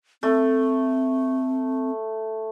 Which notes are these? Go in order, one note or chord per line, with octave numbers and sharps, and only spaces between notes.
A3 C4